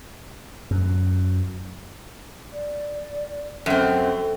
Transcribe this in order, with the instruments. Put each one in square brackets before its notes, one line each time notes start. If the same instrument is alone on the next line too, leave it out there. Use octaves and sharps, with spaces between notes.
[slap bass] F#2
[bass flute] D5
[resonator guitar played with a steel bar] F#2 C4 [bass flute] A4